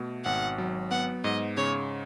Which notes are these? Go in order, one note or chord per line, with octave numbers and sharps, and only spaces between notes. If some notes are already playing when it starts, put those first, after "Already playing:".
Already playing: B2 A3
G#1 F#5
F#3
B3 F#5
G#2 D#5
C#3 C#5